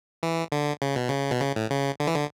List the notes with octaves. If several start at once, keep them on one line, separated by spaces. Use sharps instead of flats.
E3
D3
C#3
B2
C#3
B2
C#3
A2
C#3
D3
E3
D3